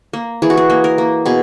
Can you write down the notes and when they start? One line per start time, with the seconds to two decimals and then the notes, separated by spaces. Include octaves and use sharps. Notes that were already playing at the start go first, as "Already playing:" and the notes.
0.13 A#3
0.42 E3 G#4
0.50 F#4
0.57 G#4
0.70 A#3
0.84 A#4
0.98 A#3
1.26 B2 G#4